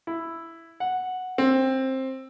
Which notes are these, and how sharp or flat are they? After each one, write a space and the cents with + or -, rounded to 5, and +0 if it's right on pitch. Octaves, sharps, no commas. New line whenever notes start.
E4 +5
F#5 -5
C4 +15